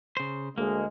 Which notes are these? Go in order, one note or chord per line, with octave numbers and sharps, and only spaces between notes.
C#3 C5
D2 G#3 A#3